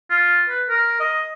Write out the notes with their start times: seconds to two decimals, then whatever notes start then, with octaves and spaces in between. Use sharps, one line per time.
0.10 F4
0.49 B4
0.70 A#4
1.00 D#5